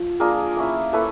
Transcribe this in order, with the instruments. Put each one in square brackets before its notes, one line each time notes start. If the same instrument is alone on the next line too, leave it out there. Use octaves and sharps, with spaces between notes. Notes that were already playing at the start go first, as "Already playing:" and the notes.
Already playing: [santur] F3
A#3 D4 F4 G#4 A#4
A#3 C#4 E4
A#3 C#4 E4 A4 B4